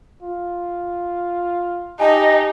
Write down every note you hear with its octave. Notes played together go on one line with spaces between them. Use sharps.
F4
D#4 G4 D#5 G#5 A5